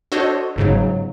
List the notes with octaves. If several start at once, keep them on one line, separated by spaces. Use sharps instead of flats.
D4 F#4 A4 C5 C#5 D#5
G1 G#2 C#3 F#3